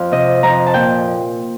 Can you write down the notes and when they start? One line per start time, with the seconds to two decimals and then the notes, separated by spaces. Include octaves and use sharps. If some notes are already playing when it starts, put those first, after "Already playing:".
Already playing: F2 F5
0.12 C3 D#5
0.43 F2 A#5
0.66 A5
0.74 A#2 G5